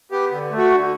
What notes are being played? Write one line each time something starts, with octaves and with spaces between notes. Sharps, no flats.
B3 G4
D3
A3
F#4
D3